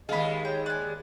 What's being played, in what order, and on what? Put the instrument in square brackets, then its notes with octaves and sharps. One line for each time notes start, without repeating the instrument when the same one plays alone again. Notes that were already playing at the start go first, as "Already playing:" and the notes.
[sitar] D#2 G#3 G#4 [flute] D#5 [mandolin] F5 B5
[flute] C#5 [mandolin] G5
[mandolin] D5 G#5 [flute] F#6